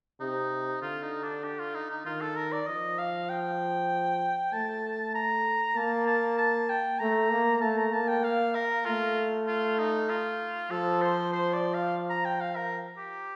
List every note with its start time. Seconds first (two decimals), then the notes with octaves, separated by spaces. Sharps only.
0.21 C3 D#4
0.82 D3 F4
1.03 D#4
1.24 D4
1.44 G4
1.59 F4
1.75 D#4
1.91 D#4
2.05 D#3 F4
2.21 A4
2.37 A#4
2.52 D5
2.67 F3 D#5
2.98 F5
3.30 G5
4.53 A3 A5
5.15 A#5
5.76 A#3 A5
6.07 A5
6.38 A5
6.70 G5
7.00 A3 A#5
7.31 A#3
7.61 A3 A5
7.77 A#5
7.92 A#3 A5
8.08 G5
8.24 F5
8.55 A#4
8.86 A3 F4
9.48 F4
9.78 D#4
10.09 F4
10.71 F3 A4
11.02 C5
11.33 C5
11.54 D5
11.74 F5
12.10 A#5
12.25 G5
12.41 F5
12.56 A#4
12.98 G4